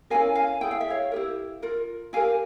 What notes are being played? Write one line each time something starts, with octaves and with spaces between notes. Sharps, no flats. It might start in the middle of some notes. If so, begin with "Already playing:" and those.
C#4 E4 G4 A#4 F5 G#5
F5 G#5
E4 G#4 G5
F5
E5
C#5 F5
E4 G4 A#4
F4 A#4
E4 G4 A#4 F5 G#5